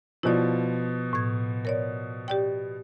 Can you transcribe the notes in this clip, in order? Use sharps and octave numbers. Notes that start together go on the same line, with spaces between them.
B2 F3 E4 D5
A2 G#6
A#4 C#5 D5
G4 D5 G5